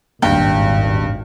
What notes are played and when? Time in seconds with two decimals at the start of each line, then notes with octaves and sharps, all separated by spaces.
0.22 D#1 G#1 E2 G2 A#3 G5